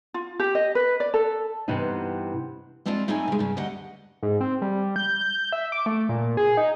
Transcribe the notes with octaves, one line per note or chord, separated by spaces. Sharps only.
F4
G4
D#5
B4
D5
A4
G2 C3 E3 B3 D#4
G#3 C4 D4 E4 F4
A3 C4 D#4 E4 C#5 G#5
C#3 G#3
G2 C#3
D2 G4 D#5 F#5
G#2
C4
G3
G6
G6
E5
D6
A3
A#2
G#4
D#4